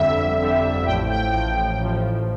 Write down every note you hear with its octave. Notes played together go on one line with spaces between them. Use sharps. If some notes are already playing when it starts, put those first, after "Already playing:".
Already playing: G1 F2 D3 G3 E5
G1 F2 D3 G3
A1 A2 F3 G5
G5
A1 A2 F3 G5
A1 A2 F3